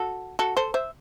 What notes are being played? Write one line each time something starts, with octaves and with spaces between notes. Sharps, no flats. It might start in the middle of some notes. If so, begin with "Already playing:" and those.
Already playing: F#4 A4
F#4 A4
A4 C5
C5 E5